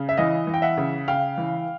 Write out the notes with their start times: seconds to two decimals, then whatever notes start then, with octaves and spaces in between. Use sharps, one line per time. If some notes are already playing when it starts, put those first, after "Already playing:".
Already playing: C#3
0.09 E5
0.17 E3 D#5 F5
0.47 E3
0.54 G5
0.62 E5 F#5
0.77 C#3
1.08 C#3 F5 G5
1.37 E3